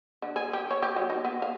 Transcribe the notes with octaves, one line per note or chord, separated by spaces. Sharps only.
D3
G#4
G4
C#5
G4
F#3
D#4
B3
F5